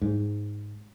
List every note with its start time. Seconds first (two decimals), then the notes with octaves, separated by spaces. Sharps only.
0.02 G#2